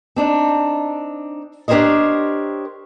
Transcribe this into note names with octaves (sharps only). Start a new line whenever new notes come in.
C4 D4 D#4
D4 G4 A#4 C5 C#5 D#5